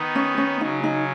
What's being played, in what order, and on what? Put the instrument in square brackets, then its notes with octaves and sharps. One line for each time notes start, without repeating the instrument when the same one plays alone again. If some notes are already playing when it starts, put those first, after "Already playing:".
Already playing: [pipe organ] D#3 B3 D#4
[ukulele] C#4
C#4
[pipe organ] C#3 F#3 C#4 [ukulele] D#4
[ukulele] D#4